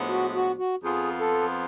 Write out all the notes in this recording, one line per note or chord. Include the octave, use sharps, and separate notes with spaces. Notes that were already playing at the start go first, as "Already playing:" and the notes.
Already playing: A2 F3 G#3 B3 D4
F#4
F#4
F#4
F2 F3 B3 F4 G#4
A4